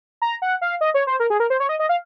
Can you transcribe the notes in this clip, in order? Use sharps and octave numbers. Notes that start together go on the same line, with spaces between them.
A#5
F#5
F5
D#5
C#5
C5
A#4
G#4
A#4
C5
C#5
D#5
D#5
F5